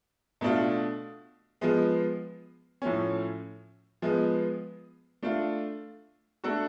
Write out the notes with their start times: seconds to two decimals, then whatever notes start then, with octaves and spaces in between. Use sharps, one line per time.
0.41 B2 A3 D4 F4
1.61 F3 G#3 B3
2.82 A2 F3 A3 C#4
4.02 F3 G#3 B3
5.22 A3 D4 F4
6.44 A3 D4 F#4 A4